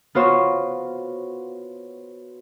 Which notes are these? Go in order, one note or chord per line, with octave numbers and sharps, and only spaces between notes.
B3 F4 F#4 C5 C#5